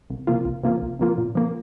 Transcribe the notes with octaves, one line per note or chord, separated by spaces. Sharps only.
C2
C3 F3 A#3 F4
C2
C3 F3 A#3 F4
C2
C3 F3 A#3 F4
A#2
F3 A#3